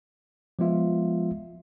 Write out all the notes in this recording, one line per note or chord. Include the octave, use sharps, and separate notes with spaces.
F3 G#3 B3 F4 E5